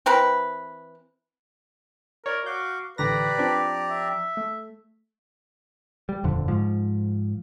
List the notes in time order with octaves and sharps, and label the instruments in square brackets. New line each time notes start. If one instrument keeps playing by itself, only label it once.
[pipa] E3 C4 A#4 B4
[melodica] E4 [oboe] A#4 [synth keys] C#5 D5
[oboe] F#4 [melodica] F5 D6 [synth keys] G6
[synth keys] A1 D3 A#6 [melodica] G4 D5 A#5 [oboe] B4
[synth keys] F3 C4 D4
[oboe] E5
[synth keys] A3
[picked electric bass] G3
D#1 F2 D3
G#2 F3